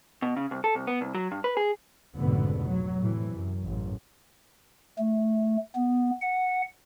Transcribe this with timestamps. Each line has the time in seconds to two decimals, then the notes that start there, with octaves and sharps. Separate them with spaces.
0.22 B2
0.36 C#3
0.51 C2
0.64 A4
0.75 C2
0.87 B3
1.01 C2
1.15 F#3
1.31 G2
1.44 B4
1.57 G#4
2.16 F1 C#2 G#2 B2 D3 B3
2.68 F#3
2.98 A2 C3 E3
3.33 F#2
3.65 A1 F#2
4.99 A3
5.75 B3
6.21 F#5